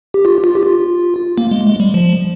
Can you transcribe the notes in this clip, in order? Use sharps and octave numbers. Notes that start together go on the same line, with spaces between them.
G4
F4
F4
G4
F4
A#3
G#3
G#3
G3
F3